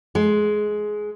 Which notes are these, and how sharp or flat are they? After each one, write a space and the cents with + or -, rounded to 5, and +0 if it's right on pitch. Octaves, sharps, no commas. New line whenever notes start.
G#3 +15